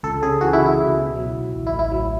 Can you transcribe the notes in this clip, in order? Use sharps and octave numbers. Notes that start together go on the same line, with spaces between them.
C#2 A4
C#3 G#4
E3 F#4
E4
C#2
E4
C#2
B2
F#3
C#2
A1
E4
A2
E4
F#3